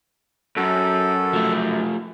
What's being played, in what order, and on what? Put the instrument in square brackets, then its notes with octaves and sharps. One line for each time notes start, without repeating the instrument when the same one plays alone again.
[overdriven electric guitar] F#2 [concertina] A4
[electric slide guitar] F3 A3